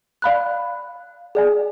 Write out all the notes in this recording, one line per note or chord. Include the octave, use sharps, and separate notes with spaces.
D5 F5 B5 F#6
G#4 D5 G#5